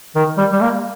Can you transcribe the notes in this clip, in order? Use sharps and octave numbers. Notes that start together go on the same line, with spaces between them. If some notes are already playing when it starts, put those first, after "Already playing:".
D#3
G3
G3
A#3